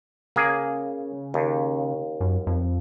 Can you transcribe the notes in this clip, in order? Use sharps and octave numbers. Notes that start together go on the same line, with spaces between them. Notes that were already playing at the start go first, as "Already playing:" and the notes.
C#3 A#3 G#4
D#2
F#2
F2